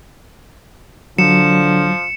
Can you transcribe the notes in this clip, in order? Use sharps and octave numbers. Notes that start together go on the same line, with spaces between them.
D3 F3 F#3 C#7 E7